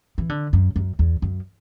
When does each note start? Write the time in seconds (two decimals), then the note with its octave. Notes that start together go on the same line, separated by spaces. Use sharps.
0.18 E3
0.29 D3
0.53 F#2
0.76 F#2
0.99 E2
1.22 F#2